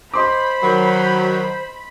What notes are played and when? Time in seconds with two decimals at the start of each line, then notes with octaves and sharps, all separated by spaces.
0.14 C5 D#5 B5 C6 D6
0.63 D#3 F#3